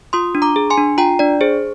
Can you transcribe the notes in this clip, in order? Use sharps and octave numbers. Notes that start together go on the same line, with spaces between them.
F4 C6 D#6
D4
A#5 D6
G#4
G#5 C6
D4
F4 G5 A#5
D4 D5
G#4 C5